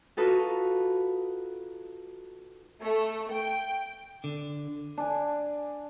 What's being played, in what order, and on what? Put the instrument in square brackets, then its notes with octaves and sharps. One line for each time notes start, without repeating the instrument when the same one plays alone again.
[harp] D#4 F4 F#4 A4 B4
[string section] A3
G5
[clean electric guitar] D3
[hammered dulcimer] D4 G#5